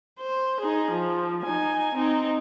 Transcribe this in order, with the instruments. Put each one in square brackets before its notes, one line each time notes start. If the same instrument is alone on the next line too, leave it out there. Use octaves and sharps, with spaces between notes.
[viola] C5
D#4 G#4
F3
D#4 G#5
C4 D#4